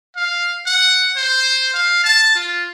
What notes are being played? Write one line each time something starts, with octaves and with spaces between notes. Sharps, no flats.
F5
F#5
C5
F5
A5
F4